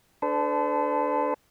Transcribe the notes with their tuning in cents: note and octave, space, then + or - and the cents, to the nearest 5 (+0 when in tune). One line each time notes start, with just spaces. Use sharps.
D4 +0 A4 -10 C5 -45